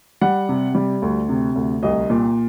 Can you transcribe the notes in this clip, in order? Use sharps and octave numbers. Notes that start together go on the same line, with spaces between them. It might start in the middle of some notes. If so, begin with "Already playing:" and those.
G3 F#5
C3
G3
D2
C3
D2
C2 D#5
A#2